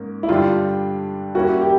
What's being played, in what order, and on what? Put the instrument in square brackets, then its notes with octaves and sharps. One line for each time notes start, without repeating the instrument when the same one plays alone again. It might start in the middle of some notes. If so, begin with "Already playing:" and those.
Already playing: [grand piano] G#2 A#3 C#4
[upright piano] E4
[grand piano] G2 D3 G3 [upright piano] F4
[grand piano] G3 A#3 C#4 E4 [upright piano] F#4
[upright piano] G4